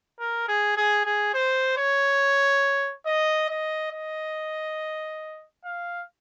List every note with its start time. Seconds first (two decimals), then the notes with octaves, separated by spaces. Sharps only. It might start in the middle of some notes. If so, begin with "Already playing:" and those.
0.20 A#4
0.48 G#4
0.77 G#4
1.05 G#4
1.34 C5
1.78 C#5
3.06 D#5
3.49 D#5
3.92 D#5
5.65 F5